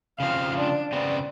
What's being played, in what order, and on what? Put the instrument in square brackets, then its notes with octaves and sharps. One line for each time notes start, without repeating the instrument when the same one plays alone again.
[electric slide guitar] C#3 F3 C4 [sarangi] F5
[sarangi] D4
[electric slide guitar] C#3 B3 C4 [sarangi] D5